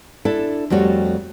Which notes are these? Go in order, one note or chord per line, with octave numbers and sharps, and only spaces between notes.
D4 E4 A4
F2 G3 A3 F#4 C#5